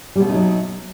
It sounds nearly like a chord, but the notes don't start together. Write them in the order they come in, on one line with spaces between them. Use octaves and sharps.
G3 B2 A3 D#4 F#3